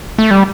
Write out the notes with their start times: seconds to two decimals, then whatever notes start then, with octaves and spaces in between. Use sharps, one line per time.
0.18 A3
0.31 G3